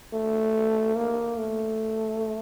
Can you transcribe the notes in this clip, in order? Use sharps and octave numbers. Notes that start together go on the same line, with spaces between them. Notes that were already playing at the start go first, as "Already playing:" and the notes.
A3
A#3
A3